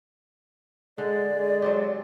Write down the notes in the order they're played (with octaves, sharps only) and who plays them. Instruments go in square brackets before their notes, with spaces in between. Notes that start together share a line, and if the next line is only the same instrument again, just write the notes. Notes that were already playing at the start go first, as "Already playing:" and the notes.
[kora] D3 [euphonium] G#3 [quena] D5
[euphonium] G#3
[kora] F#3 C4 G4